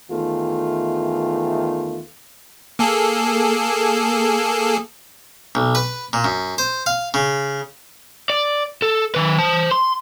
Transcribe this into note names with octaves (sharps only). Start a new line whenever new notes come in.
E2 D#3 A3 F4
A#3 G#4 A4
B1
B4
A#2
F#2
C5
F5
C#3
D5
A4
D#3 B4
C5 A5
C6